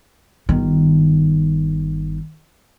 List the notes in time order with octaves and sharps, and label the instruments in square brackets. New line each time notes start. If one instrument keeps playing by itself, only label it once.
[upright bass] G1 D#3